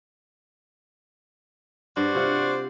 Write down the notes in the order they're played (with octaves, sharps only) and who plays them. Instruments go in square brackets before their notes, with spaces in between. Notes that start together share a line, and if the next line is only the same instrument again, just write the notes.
[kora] G2 [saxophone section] F#4 C5 D5
[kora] C3 F4 F#5